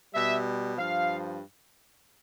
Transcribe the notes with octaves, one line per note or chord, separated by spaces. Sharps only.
B2 G3 E5
G2 F3 F5